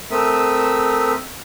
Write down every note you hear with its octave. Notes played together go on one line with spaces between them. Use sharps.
A3 C4 A#4 E5 D#6 E6